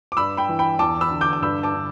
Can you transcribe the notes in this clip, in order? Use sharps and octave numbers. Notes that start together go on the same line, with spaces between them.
D6
G2 B5 E6
G5 B5
E3
G5 B5
E2 A5 D6
B5 E6
D3
D6 G6
D6
G2 B5 E6
A5 D6
D3